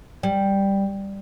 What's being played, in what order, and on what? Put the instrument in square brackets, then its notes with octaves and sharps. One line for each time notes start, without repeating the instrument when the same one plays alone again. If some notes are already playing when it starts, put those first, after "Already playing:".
[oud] G3